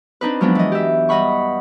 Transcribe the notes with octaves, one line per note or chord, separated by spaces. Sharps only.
C4 D4 D#4 B4
F3 F#3 G#3 B3 D4
E3 D#5
G4 E5
G2 D#5 F#5 B5 C#6